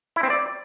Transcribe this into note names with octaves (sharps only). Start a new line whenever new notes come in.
E4
C4
D5